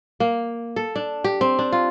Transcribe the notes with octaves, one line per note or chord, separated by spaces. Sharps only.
A#3
A4
D4
G4
C4
D4
F4